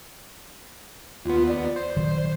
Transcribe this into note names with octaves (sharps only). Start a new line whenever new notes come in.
D#2 B3 F4
D5
C5
A#1 D#3 F#3